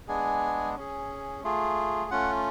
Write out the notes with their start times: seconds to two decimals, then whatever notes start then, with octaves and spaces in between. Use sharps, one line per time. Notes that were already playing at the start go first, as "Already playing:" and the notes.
0.08 G#3 B3 D4 G#4 G#5
0.76 C#4 G#4
1.43 A3 F4 G#4
2.11 A3 C#4 F4 F#5